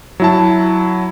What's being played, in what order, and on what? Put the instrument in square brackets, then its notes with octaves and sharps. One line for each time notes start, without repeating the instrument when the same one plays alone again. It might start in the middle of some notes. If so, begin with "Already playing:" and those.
[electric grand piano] F#3 E4 A5